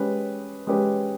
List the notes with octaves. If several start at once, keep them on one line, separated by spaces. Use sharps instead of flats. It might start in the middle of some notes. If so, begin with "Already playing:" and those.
Already playing: G#3 C#4 G4 B4
G#3 C#4 G4 B4